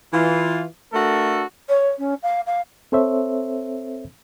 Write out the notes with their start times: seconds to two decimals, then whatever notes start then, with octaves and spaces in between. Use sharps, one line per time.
0.13 E3 F4
0.93 A3 D4 F#4 A4 A#4
1.69 C#5
1.99 C#4
2.23 F5
2.47 F5
2.92 C4 A4 C5 C#5 E5